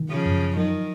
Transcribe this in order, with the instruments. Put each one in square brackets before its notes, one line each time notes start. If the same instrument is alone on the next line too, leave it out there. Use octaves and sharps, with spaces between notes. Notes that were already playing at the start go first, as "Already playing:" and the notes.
Already playing: [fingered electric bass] D#3
[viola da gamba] C#3 F3
[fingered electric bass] F#2
[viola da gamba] D#3 [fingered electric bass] F#3